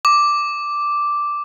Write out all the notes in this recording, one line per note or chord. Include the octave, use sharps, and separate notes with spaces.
D6